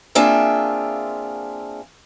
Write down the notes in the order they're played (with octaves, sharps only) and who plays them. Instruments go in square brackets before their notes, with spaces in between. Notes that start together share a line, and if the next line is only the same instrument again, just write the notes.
[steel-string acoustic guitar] A#3 C4 D4 F4 G#4 E5